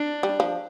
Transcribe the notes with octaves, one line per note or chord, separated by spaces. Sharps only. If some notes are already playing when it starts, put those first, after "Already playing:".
Already playing: D4
G3
F3